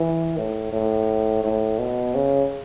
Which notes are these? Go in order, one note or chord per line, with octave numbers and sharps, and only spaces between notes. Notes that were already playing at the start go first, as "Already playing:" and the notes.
Already playing: E3
A2
A2
A2
B2
C#3